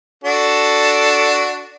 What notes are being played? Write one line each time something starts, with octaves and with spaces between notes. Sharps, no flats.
D4 F#4 A4